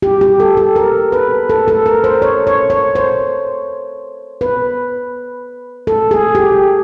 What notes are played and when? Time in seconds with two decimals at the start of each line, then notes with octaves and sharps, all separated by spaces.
0.02 G4
0.21 G4
0.40 A4
0.57 A4
0.76 A#4
1.12 B4
1.50 A4
1.68 A4
1.86 A#4
2.04 C5
2.22 C#5
2.47 C#5
2.70 C#5
2.95 C5
4.41 B4
5.87 A4
6.11 G#4
6.35 G4